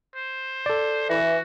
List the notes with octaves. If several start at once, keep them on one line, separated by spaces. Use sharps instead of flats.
C5
A4 D5
E3 F#4